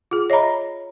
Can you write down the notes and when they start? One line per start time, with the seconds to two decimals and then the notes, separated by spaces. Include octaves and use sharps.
0.11 F4 G#4
0.30 C#5 D#5 E5 A#5 B5